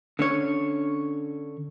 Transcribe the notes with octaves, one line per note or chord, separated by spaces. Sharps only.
D3 C#4 C#5